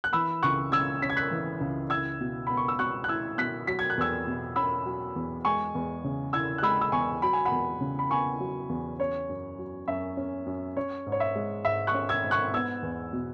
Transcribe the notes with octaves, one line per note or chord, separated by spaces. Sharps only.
F#6
E3 B5 E6
C#2 C#6 F#6
C#3 E6 G#6
C#4 B6
G#6
F#6 B6
E3
C#2
E4 E6 G#6
B2
B3 B5
C#6
E6
B2 C#6 F#6
F#6
E4 E6 G#6
B2 F#6 B6
F#3 B6
G#6
F#6
E2 E6 G#6
B2
C#4 B5 E6
F#3
E2
G#3 G#5 C#6
E2
C#3
E4 E6 G#6
F#6
G#3 B5 E6
E6
E2 G#5 C#6
F#3 B5
G#5
F#5 B5
E2
C#3
B5
B3 G#5 C#6
F#3
E2
C#4 C#5
F#2
F#3
F#2 E5
C#4
F#2
C#4 C#5
G#2
C#5
E5
G#3
G#2 E5
C#6 F#6
C#4
E6 G#6
G#2
C#6 F#6
B3 E6 G#6
E2
B2